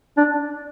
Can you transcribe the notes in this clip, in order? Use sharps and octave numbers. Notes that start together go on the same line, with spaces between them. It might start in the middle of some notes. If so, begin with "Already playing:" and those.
D4